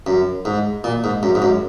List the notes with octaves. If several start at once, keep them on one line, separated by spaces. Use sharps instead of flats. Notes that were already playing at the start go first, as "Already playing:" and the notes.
F#2
G#2
A#2
G#2
F#2
G#2
F#2